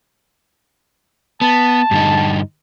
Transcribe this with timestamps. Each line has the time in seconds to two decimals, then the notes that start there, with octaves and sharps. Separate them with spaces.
1.41 B3 A5
1.91 G2 D3 D#4